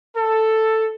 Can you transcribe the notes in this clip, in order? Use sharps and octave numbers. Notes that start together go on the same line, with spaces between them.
A4